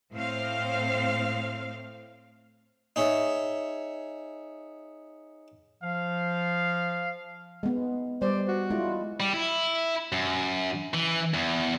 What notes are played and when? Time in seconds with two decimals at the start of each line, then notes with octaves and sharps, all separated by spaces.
0.12 A2 C4 C5 F5
2.96 D#4 G#4 C#5 E5
5.83 F3 F5
7.63 G#3 B3
8.22 G3 C5 D5
8.48 F#4
8.70 G#3 E4 F4
9.20 G3
9.34 E4
10.12 F#2
10.94 E3
11.34 E2